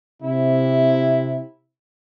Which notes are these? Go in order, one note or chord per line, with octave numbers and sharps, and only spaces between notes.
C3 E4